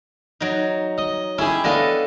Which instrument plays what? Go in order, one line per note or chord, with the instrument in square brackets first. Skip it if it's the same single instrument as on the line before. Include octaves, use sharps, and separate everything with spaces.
[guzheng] F#3 D#4
[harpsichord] D#5
[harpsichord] C#4 G#4 [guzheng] E4 G4
[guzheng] B3 A4 D#5 [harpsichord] D4 F5